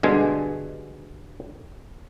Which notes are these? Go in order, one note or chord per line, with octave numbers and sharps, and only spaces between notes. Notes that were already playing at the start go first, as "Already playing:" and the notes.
G2 B2 D3 G#3 G#5